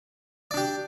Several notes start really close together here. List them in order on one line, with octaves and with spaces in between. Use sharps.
D5 D4 G4